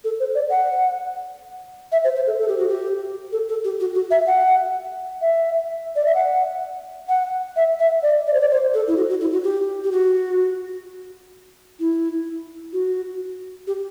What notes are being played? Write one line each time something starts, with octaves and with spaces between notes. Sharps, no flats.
A4
C5
D5
F#5
E5
C5
C5
A4
A4
G4
F#4
G4
A4
A4
G4
F#4
F#4
E5
F#5
E5
D5
E5
F#5
F#5
E5
E5
D5
D5
C5
D5
C5
A4
E4
F#4
F#4
E4
F#4
G4
G4
F#4
E4
F#4
G4